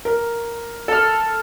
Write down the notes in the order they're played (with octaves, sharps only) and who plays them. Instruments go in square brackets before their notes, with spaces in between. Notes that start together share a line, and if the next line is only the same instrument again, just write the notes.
[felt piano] A#4
[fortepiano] A4 F6